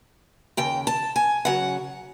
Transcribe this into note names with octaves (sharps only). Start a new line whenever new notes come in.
D#2 C#3 G5
A5
G#5
C#3 F#3 F#5